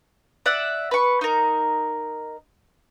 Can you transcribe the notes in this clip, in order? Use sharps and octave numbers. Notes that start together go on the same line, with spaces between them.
D5 E5 F#5
B4 C#6
D#4 A#4